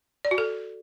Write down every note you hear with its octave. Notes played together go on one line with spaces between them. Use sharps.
D5
F#4
A4